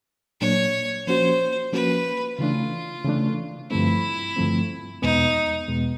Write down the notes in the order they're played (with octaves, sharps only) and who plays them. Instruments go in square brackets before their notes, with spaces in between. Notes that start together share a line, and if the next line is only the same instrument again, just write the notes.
[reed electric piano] A#2 F#3 A#3 D4 [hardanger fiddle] C#5
[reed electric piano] F3 A#3 C#4 F#4 [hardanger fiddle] C5
[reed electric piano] F3 A#3 C#4 F#4 [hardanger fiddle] B4
[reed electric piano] C#3 E3 A3 D4 [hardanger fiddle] F4
[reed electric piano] C#3 E3 A3 D4
[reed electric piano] G2 D3 F3 A3 C4 [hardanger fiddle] E4
[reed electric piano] G2 D3 F3 A3 C4
[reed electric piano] E2 B2 G#3 B3 [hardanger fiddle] D#4
[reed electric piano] E2 B2 G#3 B3